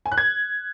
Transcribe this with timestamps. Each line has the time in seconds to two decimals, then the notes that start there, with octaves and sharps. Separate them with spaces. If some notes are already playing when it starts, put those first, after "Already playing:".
0.06 G#5
0.12 F#6
0.18 G#6